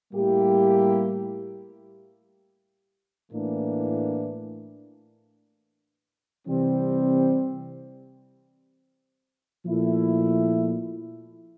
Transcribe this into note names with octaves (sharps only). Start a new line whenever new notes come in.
A2 G3 A#3 E4 G4
A2 E3 A#3 D4
C3 E3 G3 C4
A#2 F3 A3 E4